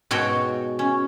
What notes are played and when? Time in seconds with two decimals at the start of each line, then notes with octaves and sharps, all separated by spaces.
0.11 G#2 B2 F#4 C#5 G5
0.79 C#4